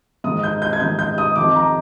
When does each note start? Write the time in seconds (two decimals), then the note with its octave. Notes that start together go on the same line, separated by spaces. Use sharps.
0.24 G#2 D#3 D#6
0.43 G6
0.62 G6
0.73 G#6
0.80 G#2 D#3 G6
0.99 G6
1.18 D#6
1.36 F2 D#3 D6
1.55 A#5